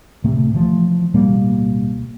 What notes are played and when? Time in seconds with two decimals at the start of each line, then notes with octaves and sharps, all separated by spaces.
0.24 D1 C3 A3
0.54 E3 F3 A3
1.14 D1 B2 G3 A#3